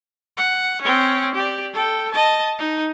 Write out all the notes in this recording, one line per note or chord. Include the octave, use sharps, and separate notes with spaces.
F#5
C4 C#4
G4 D5
A4 G5
D#5 A5
D#4